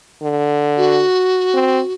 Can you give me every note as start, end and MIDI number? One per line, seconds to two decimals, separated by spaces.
0.22 1.03 50
0.77 1.93 66
1.54 1.80 60